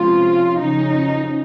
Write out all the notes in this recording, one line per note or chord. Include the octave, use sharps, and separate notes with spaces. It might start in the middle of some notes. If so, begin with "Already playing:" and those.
Already playing: C3 F3 G#3 C#4 F4
F2 C#3 F#3 C#4 D#4